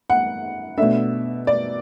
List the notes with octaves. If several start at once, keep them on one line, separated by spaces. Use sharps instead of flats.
F#5
B2 A3 D4 E5
D5